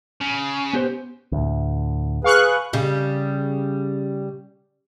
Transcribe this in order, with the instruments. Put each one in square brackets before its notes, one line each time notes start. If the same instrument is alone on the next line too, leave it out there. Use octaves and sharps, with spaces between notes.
[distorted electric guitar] C#3
[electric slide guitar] B3 G4 C5
[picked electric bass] D2 A2
[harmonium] G#4 B4 [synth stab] F5 C#6 F#6
[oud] C#3 G3